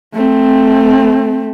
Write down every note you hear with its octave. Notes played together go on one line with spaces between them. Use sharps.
A3 C4